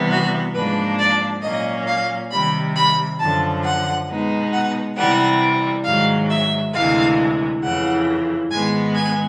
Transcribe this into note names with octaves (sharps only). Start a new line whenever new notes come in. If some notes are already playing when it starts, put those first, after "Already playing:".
Already playing: C3 E3 G3 B3
F#4
G#2 F3 A#3 D4 B4
D5
A#2 F#3 A#3 C#4 D#5
F5
C3 D#3 G3 B5
B5
F#2 D3 F3 A5
F#5
B2 G#3 B3 D#4
F#5
C3 E3 G3 F#5
G#2 D#3 F#3 F5
E5
D2 C3 E3 G#3 F5
F2 C#3 E3 F#5
G#2 D#3 G#3 B3 G#5
G#5